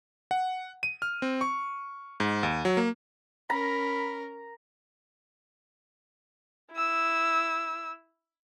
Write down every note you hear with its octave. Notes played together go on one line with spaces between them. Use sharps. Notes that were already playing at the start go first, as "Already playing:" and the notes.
F#5
D#7
F6
C4
C#6
G#2
D#2
F#3
A#3
C#4 A#4 A#5 B5
E4 E6